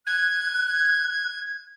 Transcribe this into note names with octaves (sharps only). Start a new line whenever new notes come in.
F#6 G#6